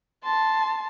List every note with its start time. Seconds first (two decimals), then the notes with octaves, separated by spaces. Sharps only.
0.24 A5 C6